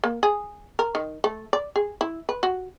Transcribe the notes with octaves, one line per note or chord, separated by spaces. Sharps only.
A#3
G#4
A#4
D#3
A3
D5
G#4
E4
B4
F#4